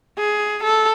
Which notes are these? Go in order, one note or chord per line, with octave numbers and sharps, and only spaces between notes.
G#4
A4